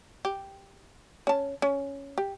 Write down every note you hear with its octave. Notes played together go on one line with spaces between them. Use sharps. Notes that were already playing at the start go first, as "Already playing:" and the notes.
G4
C#4 A5
C#4
G4